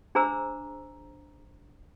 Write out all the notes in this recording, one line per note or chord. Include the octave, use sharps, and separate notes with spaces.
D4 G#4 C5 A#5 E6